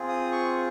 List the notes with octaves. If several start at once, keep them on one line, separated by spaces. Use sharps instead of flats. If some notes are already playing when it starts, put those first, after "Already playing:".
Already playing: C4 F4 G#4
D#6
C#6